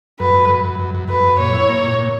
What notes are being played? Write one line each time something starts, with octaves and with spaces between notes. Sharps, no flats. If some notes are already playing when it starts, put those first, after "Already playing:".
F#2 B4
F#2
F#2
F#2
F#2
F#2
F#2 B4
F#2
A#2 C#5
E4
A#3
A#2
A#2